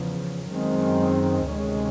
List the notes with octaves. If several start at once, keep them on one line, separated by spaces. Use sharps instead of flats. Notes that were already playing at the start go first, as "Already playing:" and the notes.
Already playing: E2 C#3 F3
F#2 D#3 G#3 C4
D2 C3 D#3 G#3 C#4